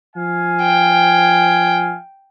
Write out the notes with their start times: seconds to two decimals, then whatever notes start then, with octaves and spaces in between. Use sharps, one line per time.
0.16 F3 F5 G#5
0.63 G5